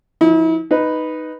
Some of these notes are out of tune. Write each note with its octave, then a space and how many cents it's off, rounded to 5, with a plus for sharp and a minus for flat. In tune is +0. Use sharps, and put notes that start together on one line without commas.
F3 +0 E4 -40
D#4 +0 B4 +0